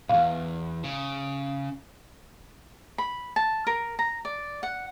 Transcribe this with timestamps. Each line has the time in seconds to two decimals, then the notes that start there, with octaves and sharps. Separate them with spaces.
0.09 B1 E2 F5
0.84 C#3
2.98 B5
3.36 A5
3.67 A#4
3.99 A#5
4.25 D5
4.63 F#5